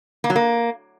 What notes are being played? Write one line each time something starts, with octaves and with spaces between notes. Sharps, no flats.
A#3
F#3
A#3